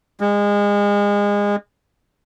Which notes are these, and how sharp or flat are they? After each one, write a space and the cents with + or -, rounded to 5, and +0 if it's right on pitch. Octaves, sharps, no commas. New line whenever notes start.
G#3 -30